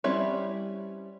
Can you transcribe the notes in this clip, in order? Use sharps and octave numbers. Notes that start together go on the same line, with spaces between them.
G3 C4 C#4 E4 C#5